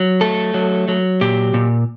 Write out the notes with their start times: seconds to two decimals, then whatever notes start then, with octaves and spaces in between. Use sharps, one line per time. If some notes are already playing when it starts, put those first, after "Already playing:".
Already playing: F#3
0.21 A3 A4
0.54 F#3
0.88 F#3
1.21 A#2 G4
1.54 A#2